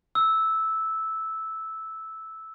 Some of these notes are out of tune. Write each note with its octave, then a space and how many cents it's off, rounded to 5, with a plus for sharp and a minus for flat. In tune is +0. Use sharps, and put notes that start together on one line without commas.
E6 -10